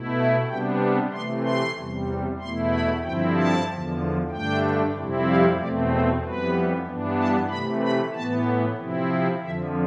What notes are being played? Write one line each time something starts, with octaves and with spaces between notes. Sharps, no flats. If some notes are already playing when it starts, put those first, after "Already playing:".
Already playing: B2 A3 E4
E5
C3 G3 B3 D4 G5
C3 E3 A3 C6
C6
E2 C3 G3
E2 B2 A3 E4 C6
B5
G2 D3 F3 C4 E4 G5
A5
E2 D3 F3
G2 D3 A3 D4 G5
F2 C3 G3 C4 E4
F5
E2 B2 A3 C4 D5
C5
F2 E3 G3 B3 B4
G2 E3 B3 D4
A5
C3 E3 A3 B5
B5
A2 E3 B3 A5
C3 F3 C4 E4
F2 D3 F3 E5